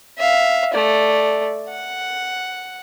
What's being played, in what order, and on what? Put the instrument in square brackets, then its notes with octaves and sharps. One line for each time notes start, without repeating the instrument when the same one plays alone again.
[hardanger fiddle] E5 F5
A3 D5
F#5